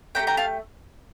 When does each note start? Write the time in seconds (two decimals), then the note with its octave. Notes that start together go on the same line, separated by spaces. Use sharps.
0.15 A3 D4 G4 G5 A#5
0.27 G5 A#5
0.37 F5 A5